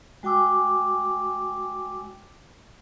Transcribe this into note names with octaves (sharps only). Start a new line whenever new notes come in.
G#3 F#4 G5 G#5 D6 E6